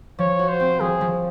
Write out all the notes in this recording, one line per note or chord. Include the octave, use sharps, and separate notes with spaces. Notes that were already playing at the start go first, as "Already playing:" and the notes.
F3 C#5
F#4
C5
C4
F3 G#4
F3